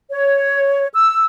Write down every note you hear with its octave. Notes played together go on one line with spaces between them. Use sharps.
C#5
E6